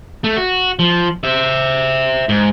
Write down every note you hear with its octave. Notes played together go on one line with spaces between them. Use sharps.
A3
F#4
F3
C5 E5
G#2